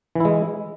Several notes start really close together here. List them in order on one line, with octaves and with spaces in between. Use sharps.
E3 E4 G#3